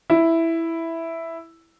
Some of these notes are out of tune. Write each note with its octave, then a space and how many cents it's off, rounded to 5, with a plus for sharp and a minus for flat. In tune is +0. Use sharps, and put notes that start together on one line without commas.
E4 +0